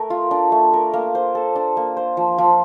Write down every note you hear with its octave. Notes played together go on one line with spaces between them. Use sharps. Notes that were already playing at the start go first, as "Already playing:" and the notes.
Already playing: A3 A#4
F4
D4
A3
A#4
A#3
C5
A4
D4
A#3
C5
F3
F3